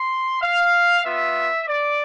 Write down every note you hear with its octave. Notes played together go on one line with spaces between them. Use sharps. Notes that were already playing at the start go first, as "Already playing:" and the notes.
Already playing: C6
F5
B3 F4 E5
D5